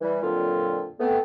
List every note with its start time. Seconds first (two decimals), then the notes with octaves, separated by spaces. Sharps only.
0.01 E3 G3
0.22 F2 A#2 D3 F#3 C4 F4
1.00 A3 B3 C4